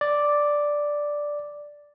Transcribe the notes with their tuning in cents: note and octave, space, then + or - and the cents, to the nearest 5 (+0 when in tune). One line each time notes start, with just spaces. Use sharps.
D5 +0